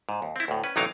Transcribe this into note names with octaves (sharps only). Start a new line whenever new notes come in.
G#2
D#2
C4 E4
D2 A2
C#4 B4
A1 C3 F#3 D#4 A#4 F5